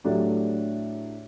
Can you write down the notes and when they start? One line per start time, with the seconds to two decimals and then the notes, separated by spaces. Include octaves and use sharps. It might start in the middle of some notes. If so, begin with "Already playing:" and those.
0.04 A2 F#3 A3 D4 G4